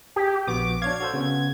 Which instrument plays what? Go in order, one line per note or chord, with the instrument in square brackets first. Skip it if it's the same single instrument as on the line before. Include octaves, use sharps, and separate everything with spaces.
[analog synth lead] G4
[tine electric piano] A#1 B3 F#4 [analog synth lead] D6
[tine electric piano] D4 C#5 F5 [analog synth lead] G#6
[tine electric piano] F#4 A4 C5
C#3 B3